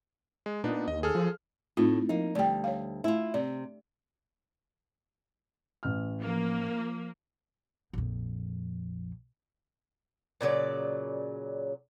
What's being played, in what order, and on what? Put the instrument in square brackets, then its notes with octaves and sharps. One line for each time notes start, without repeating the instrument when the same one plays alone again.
[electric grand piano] G#3
[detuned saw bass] A#2 [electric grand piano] B3 D4 D#4
[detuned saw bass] D#2 [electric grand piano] D#5
[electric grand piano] G#4 A4 F6
[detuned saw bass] F3
[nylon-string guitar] A2 [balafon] C4 D#4 F4
[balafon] F3 [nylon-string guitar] A#3 D#4
[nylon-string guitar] D2 G3 [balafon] D5 G5
[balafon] C#5 F5
[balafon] A3 [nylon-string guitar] E4 F4
[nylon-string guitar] C3 [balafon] D5
[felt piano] A1 F6
[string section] F3 A#3
[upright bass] A#1 F2
[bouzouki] A#2 C#3 F#3 D5